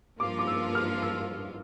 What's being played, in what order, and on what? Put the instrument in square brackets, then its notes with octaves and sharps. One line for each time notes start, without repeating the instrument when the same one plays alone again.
[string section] G2 F3 A#3 F4 [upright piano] D6
[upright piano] D6
E6
F6
E6